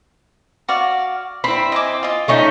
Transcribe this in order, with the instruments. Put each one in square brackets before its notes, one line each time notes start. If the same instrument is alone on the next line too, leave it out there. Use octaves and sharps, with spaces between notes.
[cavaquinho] F#4 D5 F5
[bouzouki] C4 E4 [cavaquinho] B5
[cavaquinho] D#5 G#5 D6
F4 D#5
[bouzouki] A3 C#4 D#4